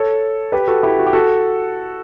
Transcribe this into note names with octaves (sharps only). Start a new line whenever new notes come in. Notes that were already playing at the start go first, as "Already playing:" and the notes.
Already playing: A4 C#5
G4 B4
F#4 A4
E4 G4
F#4
G4
F#4 A4